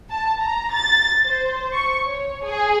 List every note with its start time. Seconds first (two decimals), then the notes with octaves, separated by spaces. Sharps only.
0.10 A5
0.40 A#5
0.74 A6
1.26 C5
1.73 C#6
2.05 C#5
2.45 G#4